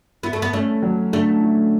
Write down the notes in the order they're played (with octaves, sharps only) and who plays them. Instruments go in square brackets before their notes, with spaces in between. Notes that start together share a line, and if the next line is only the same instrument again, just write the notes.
[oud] B3 [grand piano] E4
[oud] A3
B3
[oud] A3 [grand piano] C#4
[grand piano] F#3
[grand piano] D3 [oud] A3
[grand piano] E4